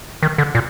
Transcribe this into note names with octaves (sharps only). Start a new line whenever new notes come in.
D#3
D3
A#2